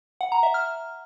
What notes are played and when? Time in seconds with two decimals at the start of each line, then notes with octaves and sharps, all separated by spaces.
0.21 F#5
0.32 A#5
0.43 E5
0.54 F6